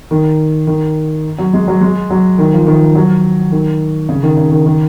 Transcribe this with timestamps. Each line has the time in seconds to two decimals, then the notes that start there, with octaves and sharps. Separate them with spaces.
0.11 D#3
0.67 D#3
1.38 F#3
1.54 G#3
1.68 F#3
1.81 G#3
2.10 F#3
2.38 D#3
2.53 F3
2.67 D#3
2.95 F#3
3.52 D#3
4.09 C#3
4.23 D#3
4.37 C#3
4.51 D#3
4.66 D#3